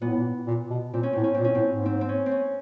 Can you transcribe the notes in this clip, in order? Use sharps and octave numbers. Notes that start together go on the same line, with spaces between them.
A#2 B3
A2
A#2
A#2
B2
A#2 C4
C#4
A2 C4
C#4
C4
A#2
C#4
A2 C4
G#2
C4
C4
C#4
C4
C#4